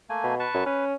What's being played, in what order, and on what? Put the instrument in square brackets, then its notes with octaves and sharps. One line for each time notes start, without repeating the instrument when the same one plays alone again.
[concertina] A3 A#3 G#5
[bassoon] B2
[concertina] B4 A5 C#6
[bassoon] F#2
[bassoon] C#4 [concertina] B4